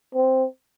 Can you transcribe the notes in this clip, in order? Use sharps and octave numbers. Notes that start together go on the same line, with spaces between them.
C4